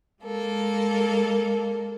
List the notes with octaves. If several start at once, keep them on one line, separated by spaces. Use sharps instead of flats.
G#3 A#3 A4